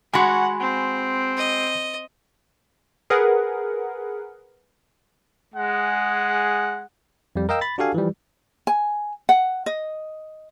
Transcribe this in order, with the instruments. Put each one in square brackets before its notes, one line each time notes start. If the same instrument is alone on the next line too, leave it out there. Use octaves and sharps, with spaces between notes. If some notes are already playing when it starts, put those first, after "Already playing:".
[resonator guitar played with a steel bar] G#3 F#4 [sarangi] F#5 [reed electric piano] G#5 B5 C6
[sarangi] C4
[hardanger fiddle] D#5
[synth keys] G#4 A#4 B4 F#5
[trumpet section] G#3 G#4 F#5
[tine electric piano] F2 G3
A#4 D#5 F5 G5 E6
B5 A6
D4 F#4 G4 A4 F5 G#5
E3 F3 G3
[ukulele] G#5
F#5
D#5